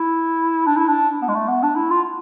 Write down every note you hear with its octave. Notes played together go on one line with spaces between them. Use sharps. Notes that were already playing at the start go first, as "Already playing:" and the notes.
Already playing: E4
D4
E4
D4
B3
G#3
A3
B3
D4
E4
F4